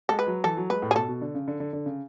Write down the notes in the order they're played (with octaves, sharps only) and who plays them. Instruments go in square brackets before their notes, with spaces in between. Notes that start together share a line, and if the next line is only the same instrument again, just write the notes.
[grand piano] G#3 [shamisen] A4
[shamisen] B4
[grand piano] F#3
[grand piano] E3 [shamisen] A4
[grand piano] F#3
[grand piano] G#3 [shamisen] B4
[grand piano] A2
[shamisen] G#4
[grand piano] B2 [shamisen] A4
[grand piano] B2
D3
C#3
D3
D3
D3
C#3